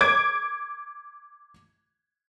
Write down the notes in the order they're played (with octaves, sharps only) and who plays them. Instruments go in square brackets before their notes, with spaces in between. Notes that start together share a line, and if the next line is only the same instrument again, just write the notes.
[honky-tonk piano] D6 G#6 D7